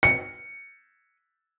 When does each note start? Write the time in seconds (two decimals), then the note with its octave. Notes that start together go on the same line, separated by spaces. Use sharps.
0.03 C#7